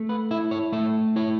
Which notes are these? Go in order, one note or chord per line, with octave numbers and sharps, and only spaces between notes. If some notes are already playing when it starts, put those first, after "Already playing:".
Already playing: A3
B4
E4 E5
C#5
A3 E5
E4 C#5